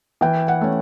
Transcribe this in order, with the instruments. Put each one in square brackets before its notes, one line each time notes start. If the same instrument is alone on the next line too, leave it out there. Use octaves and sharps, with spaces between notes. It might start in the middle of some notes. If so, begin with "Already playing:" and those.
[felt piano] E3 G5
F#5
A3 C#4